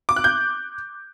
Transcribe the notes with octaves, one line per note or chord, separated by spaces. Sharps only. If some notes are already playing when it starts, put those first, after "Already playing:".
D6
F#6
G6